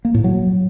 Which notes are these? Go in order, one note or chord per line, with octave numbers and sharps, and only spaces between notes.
A#3
A2
F#3